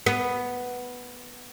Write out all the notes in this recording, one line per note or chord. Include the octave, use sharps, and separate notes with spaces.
B3